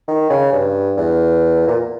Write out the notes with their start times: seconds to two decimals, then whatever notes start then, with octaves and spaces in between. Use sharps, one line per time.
0.08 D#3
0.30 C#3
0.52 G2
0.97 E2
1.67 A#2